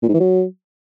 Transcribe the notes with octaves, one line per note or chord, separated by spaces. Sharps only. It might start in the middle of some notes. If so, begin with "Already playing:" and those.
A#2
G#2
E3
F#3